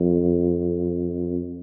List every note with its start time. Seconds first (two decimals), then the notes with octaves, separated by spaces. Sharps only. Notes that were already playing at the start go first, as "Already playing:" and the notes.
Already playing: F2